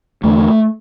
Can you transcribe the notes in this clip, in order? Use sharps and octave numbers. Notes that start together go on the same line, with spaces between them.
E2 D3 A3